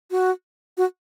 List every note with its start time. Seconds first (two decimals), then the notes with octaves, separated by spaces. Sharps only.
0.11 F#4
0.77 F#4